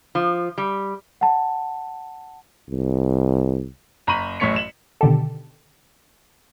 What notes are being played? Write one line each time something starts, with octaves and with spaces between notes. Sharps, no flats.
F3
G3
F#5 A5
C2
F#1 A#5 B5 C#6 D#7 F#7
A1 F#2 A2 C#5 B6 C#7
E7 F#7
B2 D3 D#3 G4 A4